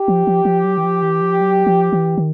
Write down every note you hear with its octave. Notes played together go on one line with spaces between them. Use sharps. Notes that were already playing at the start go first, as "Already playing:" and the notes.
Already playing: G4
F3
F3
F3
F#3
E3
F3
E3
F3
F#3
F3
E3
D#3